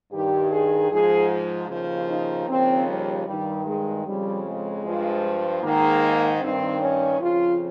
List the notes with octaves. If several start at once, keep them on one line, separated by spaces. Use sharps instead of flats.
G2 D#3 G4
G#4
G#2 F3 G#4
D#2 C#3 F3
D#4
D#2 C#3 F3 C4
G3
G2 D#3 G3
G#3
F2 C#3 F3 G3
G#3
G2 F3
G#2 D#3 A#3
G2 D#3 C4
C#4
F2 C#3 F3 F4